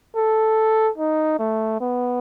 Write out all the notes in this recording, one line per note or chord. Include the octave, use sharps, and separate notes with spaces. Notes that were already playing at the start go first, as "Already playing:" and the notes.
A4
D#4
A3
B3